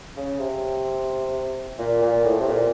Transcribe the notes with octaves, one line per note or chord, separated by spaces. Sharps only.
C#3
C3
A#2
A#2
A2
C3
A#2